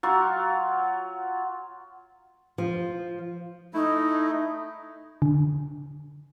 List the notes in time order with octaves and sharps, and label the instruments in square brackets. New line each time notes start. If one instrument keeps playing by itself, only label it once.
[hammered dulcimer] F#3 F4
[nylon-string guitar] F3
[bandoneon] A3 E4 [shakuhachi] D#4
[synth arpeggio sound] D3